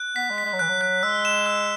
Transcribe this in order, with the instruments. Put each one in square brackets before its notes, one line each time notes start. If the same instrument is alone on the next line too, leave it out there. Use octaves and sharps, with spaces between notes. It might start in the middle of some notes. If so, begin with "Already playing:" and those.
Already playing: [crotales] F#6
[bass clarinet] B3 [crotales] B6
[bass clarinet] G#3
[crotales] B6
[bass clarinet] G#3
F#3
[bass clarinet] E3 [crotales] F#6
[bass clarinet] F#3
[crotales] F#6
[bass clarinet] G#3 [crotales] E6
[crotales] E7
E6